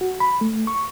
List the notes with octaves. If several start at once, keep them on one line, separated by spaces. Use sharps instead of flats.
F#4
B5
A3
C#6